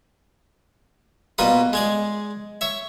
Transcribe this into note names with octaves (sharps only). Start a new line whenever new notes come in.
B2 G3 A#3 F4 B4 D#6
G#3 G#4 D5
C#5 E5